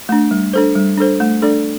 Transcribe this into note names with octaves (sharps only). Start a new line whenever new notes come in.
A3 D4
G3
D4 A4 C5
G3
D4 A4 C5
A3
D4 A4 D5